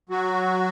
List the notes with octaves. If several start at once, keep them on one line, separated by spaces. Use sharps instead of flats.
F#3 F#4